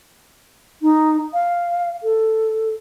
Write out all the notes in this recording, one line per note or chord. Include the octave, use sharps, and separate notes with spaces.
D#4
F5
A4